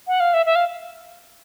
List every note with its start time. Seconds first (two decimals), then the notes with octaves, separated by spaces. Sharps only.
0.07 F#5
0.20 F5
0.34 E5
0.46 E5
0.55 F5